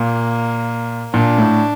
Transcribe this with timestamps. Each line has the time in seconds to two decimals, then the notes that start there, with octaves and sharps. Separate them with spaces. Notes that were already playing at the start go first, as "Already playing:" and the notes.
Already playing: A#2 A#3
1.14 A#2 D4
1.38 A2